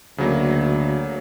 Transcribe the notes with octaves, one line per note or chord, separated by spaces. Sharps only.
D2 C#3 F#3 A#3